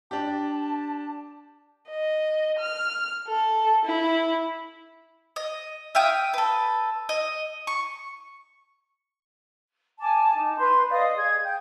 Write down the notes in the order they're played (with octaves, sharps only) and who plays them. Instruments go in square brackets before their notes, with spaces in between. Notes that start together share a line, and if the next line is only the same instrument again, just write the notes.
[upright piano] D4 G4 [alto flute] A5
[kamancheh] D#5
F6
A4
E4
[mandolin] D#5
E5 F5 G5 D#6
A4 B4
D#5
C#6
[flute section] G#5 A5 D6
D#4
B4 C6 G6
D5 D#5 F5 D#6
G#4 G#6
G5 G6